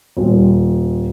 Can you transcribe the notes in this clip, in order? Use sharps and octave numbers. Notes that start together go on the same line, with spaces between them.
D#1